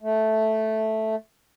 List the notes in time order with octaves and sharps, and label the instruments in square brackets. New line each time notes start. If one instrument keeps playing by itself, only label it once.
[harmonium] A3